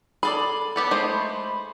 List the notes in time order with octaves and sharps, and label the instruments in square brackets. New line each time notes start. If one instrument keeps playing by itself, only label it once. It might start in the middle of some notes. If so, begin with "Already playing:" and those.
[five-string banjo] G#4 A4 D5 [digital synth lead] B5
[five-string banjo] B3 G4 A4
G#3 A3 C5